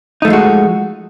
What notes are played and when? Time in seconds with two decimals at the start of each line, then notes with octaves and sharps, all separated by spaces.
0.22 D#4
0.25 A3
0.28 F3
0.30 G#3
0.33 F#4